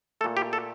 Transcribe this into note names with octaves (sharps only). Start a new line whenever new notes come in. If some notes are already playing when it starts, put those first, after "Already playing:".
A#2 A3 A4
G4
A4